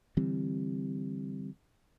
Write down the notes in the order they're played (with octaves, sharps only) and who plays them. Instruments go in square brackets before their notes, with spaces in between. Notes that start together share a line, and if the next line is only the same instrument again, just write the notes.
[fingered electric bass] D3 E3 G3 C4